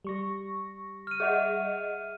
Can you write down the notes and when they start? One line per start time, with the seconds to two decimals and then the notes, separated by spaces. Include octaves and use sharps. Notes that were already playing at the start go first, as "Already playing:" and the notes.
0.05 G3 C#6 A#6
1.07 F6 D#7
1.20 G#4 D#5 E5 F#5